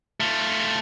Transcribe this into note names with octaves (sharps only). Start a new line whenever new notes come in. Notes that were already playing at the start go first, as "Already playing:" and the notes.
A3 F4